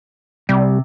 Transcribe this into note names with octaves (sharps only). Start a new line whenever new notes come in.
C3 G3